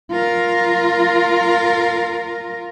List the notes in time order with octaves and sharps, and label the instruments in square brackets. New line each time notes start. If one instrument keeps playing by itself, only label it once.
[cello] F4 A#4